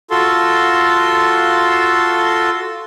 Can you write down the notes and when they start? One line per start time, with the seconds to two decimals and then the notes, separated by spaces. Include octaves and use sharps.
0.11 F4 F#4 A4 C6